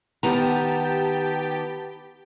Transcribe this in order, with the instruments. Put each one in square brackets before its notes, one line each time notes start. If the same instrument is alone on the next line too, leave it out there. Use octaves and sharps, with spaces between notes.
[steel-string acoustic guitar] D#3 B3 A#5 [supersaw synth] G4 G5 A5